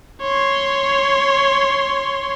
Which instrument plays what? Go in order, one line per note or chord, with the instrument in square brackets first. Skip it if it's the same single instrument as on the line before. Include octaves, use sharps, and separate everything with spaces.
[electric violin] C#5 C6